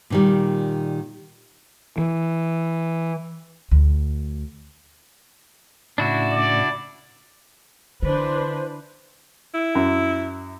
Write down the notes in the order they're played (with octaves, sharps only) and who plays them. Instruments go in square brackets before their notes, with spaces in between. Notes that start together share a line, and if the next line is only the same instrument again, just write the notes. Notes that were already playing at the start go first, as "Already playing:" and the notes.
[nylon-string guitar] A#2 D#3 G3
[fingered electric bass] E3
[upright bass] D2
[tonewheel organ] A2 C#3 [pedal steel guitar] D4 E4 F#4
[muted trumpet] D5
[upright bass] D3 [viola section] E3 D4 B4 [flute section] C5
[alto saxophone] E4
[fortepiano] F#2